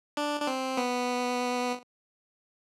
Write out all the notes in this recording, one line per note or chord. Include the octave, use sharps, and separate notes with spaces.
D4
D4
C4
B3